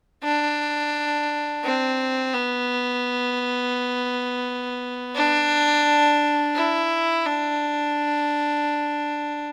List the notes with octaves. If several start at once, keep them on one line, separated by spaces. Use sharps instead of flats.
D4
C4
B3
D4
E4
D4